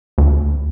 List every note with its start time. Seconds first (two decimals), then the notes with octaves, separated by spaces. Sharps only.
0.18 D2